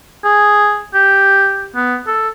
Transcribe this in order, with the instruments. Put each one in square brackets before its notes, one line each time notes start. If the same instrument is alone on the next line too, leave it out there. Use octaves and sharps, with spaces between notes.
[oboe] G#4
G4
B3
A4